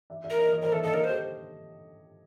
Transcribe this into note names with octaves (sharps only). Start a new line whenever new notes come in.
D5 E5
D5 E5
A#4
C#5 D#5
C#5 D#5
A#4 C5 D5
A4 D5 E5
A4 D#5 F5
A#4 C#5 D#5
G4 A4 C5